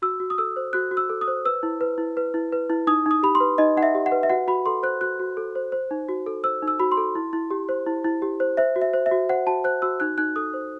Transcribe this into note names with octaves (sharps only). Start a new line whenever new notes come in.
F#4 E6
F#4
D#6
A4 E6
C5
F#4 F#6
F#4
E6
A4
D#6
C5
B4 E6
E4
B4
E4
B4
E4
B4
E4
D#4 D#6
D#4 D#6
G4 B5
C6
B4
D#4 D#5
D#4 F#5
E5
G4
F#5
B4
E5
F#4 F#5
F#4 B5
A4 C6
C5 F#6
F#4 F#6
F#4
A4
C5
C5
D#4
F#4
A4
C5 E6
D#4
E6
F#4 B5
C6
A4
E4
E4
G4
C5
E4
E4
G4
C5
C5 E5
F#4
E5
C5
E5
F#4
C5 F#5
F#4 A5
C5 F#6
F#4 E6
D#4 F#6
D#4 F#6
A4 D#6
C5